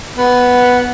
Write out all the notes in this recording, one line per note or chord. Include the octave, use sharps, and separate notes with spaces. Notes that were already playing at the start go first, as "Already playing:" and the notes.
B3